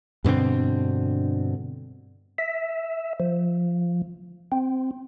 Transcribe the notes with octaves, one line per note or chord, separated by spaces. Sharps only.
G2 B2 D3 C4
E5
F3
C4